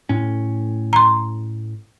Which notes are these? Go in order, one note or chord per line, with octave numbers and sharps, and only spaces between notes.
A2 C#4
A#5 C6